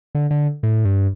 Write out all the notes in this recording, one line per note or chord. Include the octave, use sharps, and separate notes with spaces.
D3
D3
A2
G2